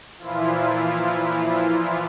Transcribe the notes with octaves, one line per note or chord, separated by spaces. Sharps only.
A#2 E3 F3 E4 F4